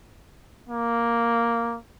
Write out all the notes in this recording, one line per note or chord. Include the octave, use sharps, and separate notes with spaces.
A#3